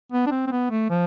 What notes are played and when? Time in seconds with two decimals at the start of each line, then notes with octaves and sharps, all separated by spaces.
0.12 B3
0.27 D4
0.31 C4
0.47 C4
0.52 B3
0.71 A3
0.90 F3